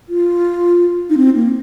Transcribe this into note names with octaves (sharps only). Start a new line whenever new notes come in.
F4
D#4
C4
A#3